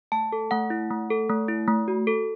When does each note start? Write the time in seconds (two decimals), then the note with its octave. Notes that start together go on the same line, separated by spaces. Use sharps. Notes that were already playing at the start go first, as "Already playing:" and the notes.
0.12 A3 A5
0.32 A4
0.51 A3 F#5
0.70 E4
0.91 A3
1.10 A4
1.29 A3
1.48 E4
1.68 A3
1.88 F#4
2.07 A4